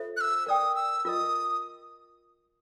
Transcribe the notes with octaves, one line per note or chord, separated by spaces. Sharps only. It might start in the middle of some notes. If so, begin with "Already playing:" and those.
Already playing: F4 A4 C5 E5
F#6
E6
A#4 D5 G5 D#6 E6
E6
F4 A#4 D#5 D#6 E6